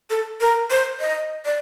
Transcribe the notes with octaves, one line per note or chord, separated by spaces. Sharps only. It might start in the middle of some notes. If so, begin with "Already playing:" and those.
A4
A#4
C5
D#5
D5